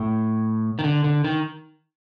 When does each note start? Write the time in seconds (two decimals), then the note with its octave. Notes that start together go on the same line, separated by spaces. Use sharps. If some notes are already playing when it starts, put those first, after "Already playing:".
Already playing: A2
0.79 D#3
0.84 D3
1.04 D3
1.24 D#3